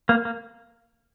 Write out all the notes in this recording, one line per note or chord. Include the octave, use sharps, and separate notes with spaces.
A#3
A#3